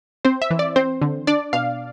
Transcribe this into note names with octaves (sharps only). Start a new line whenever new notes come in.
C4 C5
E5
E3
D5
C4 C5
D3
D4 D5
B2 F5